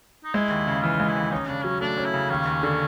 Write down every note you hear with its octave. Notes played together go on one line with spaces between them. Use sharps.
D#4
G#3 E4
D#2
C#3
E3 F4
G#3
E4
D#2
C#4 D#4
C#3 D4
F#3 C#4
A3 D4
C#4
E4
C#3
D#2 C#4
D#2
D3